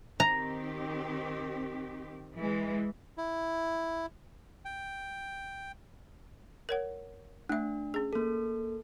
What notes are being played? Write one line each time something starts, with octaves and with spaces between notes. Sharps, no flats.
D#3 C4 G4 A#5
E3 G#3
E4
G5
A#4 C#5 F#5
A3 D4 E5
C#4 G#4
A#3 A4